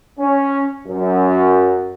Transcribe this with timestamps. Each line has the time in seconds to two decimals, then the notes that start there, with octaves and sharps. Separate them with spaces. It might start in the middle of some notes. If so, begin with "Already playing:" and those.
0.19 C#4
0.87 F#2